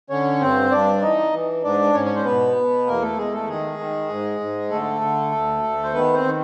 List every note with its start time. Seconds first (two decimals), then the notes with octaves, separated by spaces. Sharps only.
0.10 D3 C#4 C#5
0.40 G2 C4 C5
0.71 G2 D4 D5
1.02 E3 D#4 D#5
1.32 E3
1.63 G#2 D4 D5
1.94 G#2 C#4 C#5
2.05 C#5
2.15 C5
2.25 B2 B3 B4
2.56 B2
2.87 E2 A#3 A#4
3.02 A3 A4
3.17 E2 G#3 G#4
3.32 A3 A4
3.48 D#3 G#3 G#4
3.78 D#3
4.09 G#2
4.40 G#2
4.70 D3 A3 A4
5.01 D3
5.32 D2
5.63 D2
5.83 C5
5.93 D#3 B3 B4
6.14 C4 C5
6.24 D#3